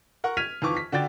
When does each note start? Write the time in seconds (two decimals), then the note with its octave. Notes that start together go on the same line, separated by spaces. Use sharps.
0.24 A#4 F#5 C#6
0.37 F6 G#6 B6 D#7 F7
0.62 F2 D#3 E3 F4 C#6 D6
0.77 B6
0.92 D3 F#4 D5 G5 A6